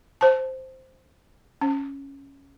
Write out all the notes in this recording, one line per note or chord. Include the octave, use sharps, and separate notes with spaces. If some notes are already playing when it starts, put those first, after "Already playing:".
C5 A5
C#4